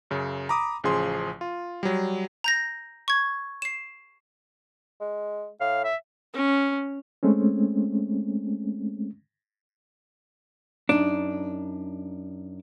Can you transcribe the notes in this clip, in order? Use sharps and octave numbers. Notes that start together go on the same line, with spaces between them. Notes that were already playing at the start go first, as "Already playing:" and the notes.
F#2 C#3
A#5 B5 D6 D#6
A1 C#3 F3 G#4 C6
F4
F#3 G3
A#5 G6 A#6
C#6 G#6
C7 E7
G#3
A2 F5
E5
C#4
G#3 A3 C4 C#4
F#2 D4 D#4